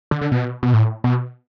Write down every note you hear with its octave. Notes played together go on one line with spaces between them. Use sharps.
D3
D3
B2
B2
A2
B2